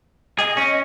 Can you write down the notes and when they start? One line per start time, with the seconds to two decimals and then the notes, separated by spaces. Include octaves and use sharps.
0.39 G#4 D#5
0.57 C#4